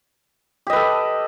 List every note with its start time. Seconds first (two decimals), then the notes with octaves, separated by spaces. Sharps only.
0.67 G4
0.70 D#5
0.73 B4
0.76 A4